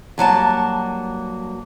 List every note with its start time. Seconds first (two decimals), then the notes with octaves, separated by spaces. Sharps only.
0.18 G2 F#3 A#3 A5